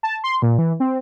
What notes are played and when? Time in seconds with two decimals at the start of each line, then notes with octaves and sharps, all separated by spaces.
0.03 A5
0.24 C6
0.42 A#2
0.58 E3
0.80 C4